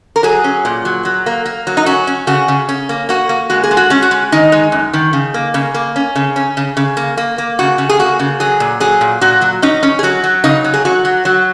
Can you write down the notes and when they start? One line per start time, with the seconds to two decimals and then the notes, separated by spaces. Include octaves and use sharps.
0.16 A#4
0.23 F#3 G#4
0.44 C#4
0.65 A#2
0.85 F#3
1.05 F#3
1.26 A#3
1.46 A#3
1.67 F#3
1.77 D#4
1.86 C#4 F#4
2.07 C#4
2.27 C#3 F#4
2.48 C#3
2.69 C#4
2.89 A#3
3.09 A#3 F#4
3.29 A#3
3.50 G#3 F#4
3.64 G#4
3.71 G#3
3.77 F#4
3.90 C#4 G#4
4.02 F#4
4.11 G#3
4.32 D#3 D#4
4.52 G#3
4.72 F#2
4.93 D#3
5.13 C#3
5.34 A#3
5.54 C#3
5.74 A#3
5.96 C#4
6.16 C#3
6.36 C#4
6.57 C#3
6.77 C#3
6.97 A#3
7.17 A#3
7.38 A#3
7.59 C#3 F#4
7.78 C#3
7.89 G#4
7.99 A#3 F#4
8.19 C#3
8.40 F#3 G#4
8.60 A#2
8.80 F#3 G#4
9.01 A#2
9.21 A#2 F#4
9.41 F#3
9.62 C#4 D#4
9.83 C#4
9.99 G#4
10.03 F#3 F#4
10.24 F#3
10.44 C#3 D#4
10.64 F#3
10.74 G#4
10.85 F#3 F#4
11.05 F#3
11.25 F#3